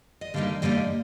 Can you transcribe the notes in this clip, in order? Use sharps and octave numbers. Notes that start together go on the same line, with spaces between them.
D#5
G2 D3 G3 A#3 D#4 F5
G2 D3 G3 A#3 D#4 D#5